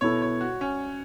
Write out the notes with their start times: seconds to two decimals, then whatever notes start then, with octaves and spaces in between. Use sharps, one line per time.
0.01 B2 B3 E4 A4 C#5
0.22 C#5
0.41 F#4
0.61 C#4